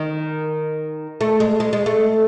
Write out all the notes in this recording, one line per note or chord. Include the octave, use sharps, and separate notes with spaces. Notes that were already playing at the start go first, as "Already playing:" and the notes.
Already playing: D#3
A3
G#3
G#3
G#3
A3